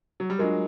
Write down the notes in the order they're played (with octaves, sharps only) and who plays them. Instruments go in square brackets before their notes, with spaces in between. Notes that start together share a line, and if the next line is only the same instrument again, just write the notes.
[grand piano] F#3
G3
[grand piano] F#3 G#3 [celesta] D4 F4 A#4